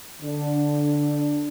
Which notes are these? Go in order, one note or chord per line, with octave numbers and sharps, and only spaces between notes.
D3 D4